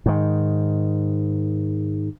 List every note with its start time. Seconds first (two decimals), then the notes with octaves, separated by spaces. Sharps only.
0.06 G#2 D#3